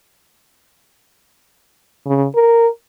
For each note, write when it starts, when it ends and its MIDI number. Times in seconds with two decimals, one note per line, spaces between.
2.07 2.26 49
2.35 2.67 70